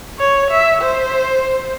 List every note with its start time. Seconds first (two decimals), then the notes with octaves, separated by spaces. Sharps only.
0.18 C#5
0.51 E5
0.82 C5